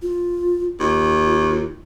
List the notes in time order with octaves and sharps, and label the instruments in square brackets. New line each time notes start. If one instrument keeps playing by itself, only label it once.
[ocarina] F4
[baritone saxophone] D#2 [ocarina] F4